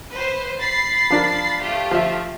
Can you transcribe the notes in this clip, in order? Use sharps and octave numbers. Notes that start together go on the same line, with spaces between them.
B4 C5
B5 A6 C7
F3 D4 A#4
A3 F4 G4
F3 E5